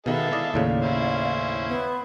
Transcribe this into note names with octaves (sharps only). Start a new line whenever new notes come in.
B2 D#3 G#3 B3 A4 E5 F5
E4 D5 D#5
D#2 A2 C#3 D5 F5
C#4 E4 C5
B3 B4